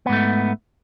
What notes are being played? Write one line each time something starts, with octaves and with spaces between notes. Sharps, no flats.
G#2 A3 B3